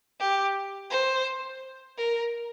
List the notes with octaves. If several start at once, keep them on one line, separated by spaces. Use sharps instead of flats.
G4
C5
A#4